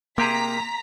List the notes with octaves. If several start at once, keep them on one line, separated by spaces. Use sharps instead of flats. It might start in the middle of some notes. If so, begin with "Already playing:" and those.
C3 A#3 G4 G#4 A#5 B6